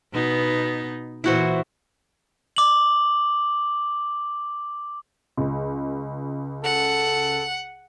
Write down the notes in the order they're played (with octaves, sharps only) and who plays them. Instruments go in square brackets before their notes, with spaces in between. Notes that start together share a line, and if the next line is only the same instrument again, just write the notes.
[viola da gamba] B2 B3 D#4
[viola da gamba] A#2 E3 [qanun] E4 F#4 C5
[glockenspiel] D6 F#7
[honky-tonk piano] C#2
[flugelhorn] A4 [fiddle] F#5